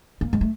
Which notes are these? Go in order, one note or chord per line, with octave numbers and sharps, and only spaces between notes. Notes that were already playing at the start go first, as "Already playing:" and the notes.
A#3
G#3
A3